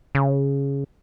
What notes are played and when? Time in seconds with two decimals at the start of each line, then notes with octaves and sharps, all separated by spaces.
0.15 C#3